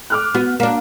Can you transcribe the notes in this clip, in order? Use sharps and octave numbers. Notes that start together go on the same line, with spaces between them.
D6 F6 F#6
B3 F#4
A#3 D4